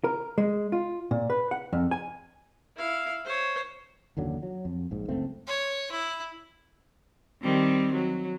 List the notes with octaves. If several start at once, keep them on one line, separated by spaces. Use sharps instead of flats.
A#4
G#3
F4
A#2
B4
F#5
F2
G#5
E4 F5
C5 C#5
F#1 D#2 D3 F#3
F#3
F2
A#1 G#2
F#1 C#2 A3 C4
C#5
E4
D#3 G3 C4
F#3